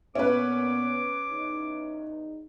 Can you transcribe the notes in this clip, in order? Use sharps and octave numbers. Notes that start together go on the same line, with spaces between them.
A#2 B3 C#4 B4 D6
E2 D#4